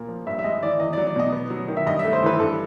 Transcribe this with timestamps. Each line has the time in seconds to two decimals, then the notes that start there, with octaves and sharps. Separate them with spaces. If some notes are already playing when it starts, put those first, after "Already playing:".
Already playing: A#2 A#3
0.08 F3
0.27 G2 E5
0.39 E5
0.44 G#3 D#5
0.63 E3 D5
0.80 E2 D#5
0.93 F#3 D5
1.07 D5
1.16 B2 D#5
1.33 B3
1.50 F#3
1.68 D#3
1.77 E5
1.86 G2 D#5
1.99 E5
2.04 A3
2.13 C5
2.23 E3 B4
2.39 G2 A4